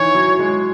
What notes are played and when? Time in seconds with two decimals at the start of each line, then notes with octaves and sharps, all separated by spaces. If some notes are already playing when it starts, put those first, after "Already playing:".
Already playing: D#3 E3 C#5
0.15 F#3
0.39 G#3